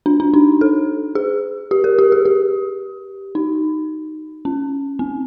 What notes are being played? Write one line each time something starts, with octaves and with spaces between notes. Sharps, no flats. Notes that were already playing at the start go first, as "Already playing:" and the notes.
D4
D4
D#4
A4
G#4
G4
A#4
G4
G#4
G4
D#4
C#4
C4